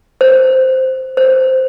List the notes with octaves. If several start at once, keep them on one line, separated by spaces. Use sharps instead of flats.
C5
C5